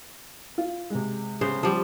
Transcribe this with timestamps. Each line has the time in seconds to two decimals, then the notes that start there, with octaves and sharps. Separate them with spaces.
0.58 F4
0.90 C3 G#3
1.41 C#3 B3 C5
1.63 F3 G3